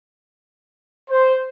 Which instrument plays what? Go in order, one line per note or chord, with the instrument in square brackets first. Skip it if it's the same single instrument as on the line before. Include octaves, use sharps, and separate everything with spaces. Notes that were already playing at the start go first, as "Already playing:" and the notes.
[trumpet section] C5